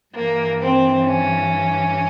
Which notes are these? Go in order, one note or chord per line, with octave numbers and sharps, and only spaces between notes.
G2 E3 A#3
C4
C#4